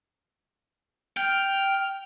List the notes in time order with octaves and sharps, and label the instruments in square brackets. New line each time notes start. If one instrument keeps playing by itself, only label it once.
[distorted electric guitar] G5 [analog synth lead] F6